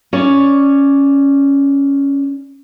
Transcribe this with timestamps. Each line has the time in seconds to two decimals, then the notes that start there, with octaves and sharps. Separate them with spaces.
0.13 C#4 C#5 D5